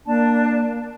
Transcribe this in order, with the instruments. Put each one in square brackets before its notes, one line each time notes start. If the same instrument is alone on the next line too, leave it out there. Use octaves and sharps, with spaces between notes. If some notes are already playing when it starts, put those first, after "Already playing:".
[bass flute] A#3 [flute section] D4 A5